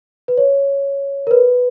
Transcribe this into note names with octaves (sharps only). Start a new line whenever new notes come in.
B4
C#5
A#4
B4